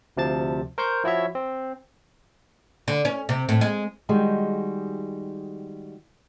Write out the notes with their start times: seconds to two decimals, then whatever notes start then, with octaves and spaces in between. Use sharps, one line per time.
0.17 D2 C3 F3 A5 A6
0.78 A#4 C5 C6 C#6 G6
1.04 F3 E4 F#4 C#5 E5
1.35 C4
2.88 D3
3.05 C#4
3.29 C3
3.49 A2
3.61 G#3
4.09 D#3 G3 G#3 F#4